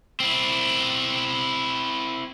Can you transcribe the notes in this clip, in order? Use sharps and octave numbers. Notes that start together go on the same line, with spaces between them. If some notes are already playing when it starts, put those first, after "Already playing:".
C4 E4